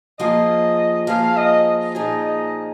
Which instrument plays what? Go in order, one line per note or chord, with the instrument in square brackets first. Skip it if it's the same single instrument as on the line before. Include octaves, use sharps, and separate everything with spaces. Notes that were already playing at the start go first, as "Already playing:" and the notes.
[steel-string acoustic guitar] F3 A#3 F4 G#4 C5 [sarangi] D#5
[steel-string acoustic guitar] F3 A#3 F4 G#4 C5 [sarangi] F5
[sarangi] D#5
D#5
[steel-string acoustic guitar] A#2 F3 A#3 D#4 G#4 [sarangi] D#5
[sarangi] D#5